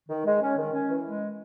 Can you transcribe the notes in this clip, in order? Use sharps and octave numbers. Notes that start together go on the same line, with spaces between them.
D#3
G#3
C#4
D#3
C#4
E3
G#3